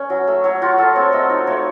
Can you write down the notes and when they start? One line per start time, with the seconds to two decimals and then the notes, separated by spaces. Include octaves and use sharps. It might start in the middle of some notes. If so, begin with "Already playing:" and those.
Already playing: C#4
0.10 F#3
0.27 A3
0.44 F#3 C#5
0.62 F4 F#4
0.78 F#3 A4
0.95 C4 C#5
1.12 A3 D#5
1.30 D#4
1.47 A3 C#5